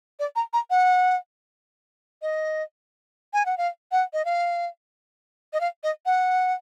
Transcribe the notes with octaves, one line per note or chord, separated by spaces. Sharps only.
D5
A#5
A#5
F#5
D#5
G#5
F#5
F5
F#5
D#5
F5
D#5
F5
D#5
F#5